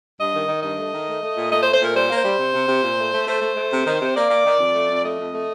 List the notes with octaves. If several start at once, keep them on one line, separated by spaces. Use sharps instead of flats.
G2 D#5
D#3
D#3
G2 D#5
A3
D#3
A3
A3
A#2
A3 D#5
C5
A3
C5
A#2 A#4
G3 C5
A#3
C5
G3
C3
C3
C3
A#2
A3
A3
A3 C5
A3
A3
C3
D#3
C3
A#3 D5
A#3
D#3
F2
A3
F2
A3 D#5
F2
A3